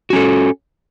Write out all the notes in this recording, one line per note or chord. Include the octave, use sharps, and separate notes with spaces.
C#4 F#4 A4